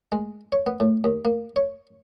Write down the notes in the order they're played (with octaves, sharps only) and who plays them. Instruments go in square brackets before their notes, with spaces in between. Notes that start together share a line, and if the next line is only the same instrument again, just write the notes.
[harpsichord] G#3
C#5
B3
A2
D#2
A#3
C#5